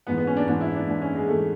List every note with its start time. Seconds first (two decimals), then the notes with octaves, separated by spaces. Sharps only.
0.07 G#2 E3 B3
0.18 B3
0.27 C#4
0.37 D4
0.48 G#2 E3 D4
0.61 E4
0.75 D4
0.87 G#2 E3 D4
1.02 C#4
1.15 G#3
1.28 G#2 E3 A3